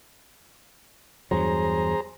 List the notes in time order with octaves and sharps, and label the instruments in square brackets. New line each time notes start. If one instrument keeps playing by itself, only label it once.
[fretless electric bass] E2 G2 F#3 [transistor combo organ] G#4 C5 A#5